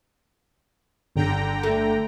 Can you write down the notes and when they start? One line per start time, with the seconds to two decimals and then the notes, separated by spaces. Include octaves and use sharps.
1.16 G1 D3 G5 A#5
1.63 A3